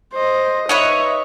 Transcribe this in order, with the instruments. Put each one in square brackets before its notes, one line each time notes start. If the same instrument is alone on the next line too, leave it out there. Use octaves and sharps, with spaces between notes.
[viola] C5 D#5
[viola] D#4 E5 [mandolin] B4 C#5 D#5